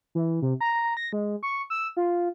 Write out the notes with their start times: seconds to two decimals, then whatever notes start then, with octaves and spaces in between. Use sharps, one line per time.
0.15 E3
0.42 C3
0.61 A#5
0.97 A#6
1.13 G#3
1.43 C#6
1.70 E6
1.97 F4